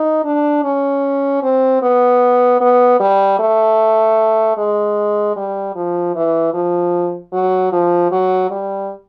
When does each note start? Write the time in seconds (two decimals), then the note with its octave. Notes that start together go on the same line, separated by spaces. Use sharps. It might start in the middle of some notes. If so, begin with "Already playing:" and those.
Already playing: D#4
0.24 D4
0.64 C#4
1.43 C4
1.82 B3
2.60 B3
3.00 G3
3.39 A3
4.57 G#3
5.36 G3
5.75 F3
6.16 E3
6.54 F3
7.33 F#3
7.72 F3
8.11 F#3
8.51 G3